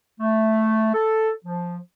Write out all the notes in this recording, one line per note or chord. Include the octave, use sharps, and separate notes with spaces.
A3
A4
F3